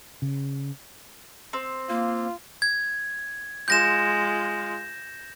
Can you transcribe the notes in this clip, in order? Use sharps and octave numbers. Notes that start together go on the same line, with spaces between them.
C#3
C4
A#3 F4
G#6
G#3 F4 G6 A#6 E7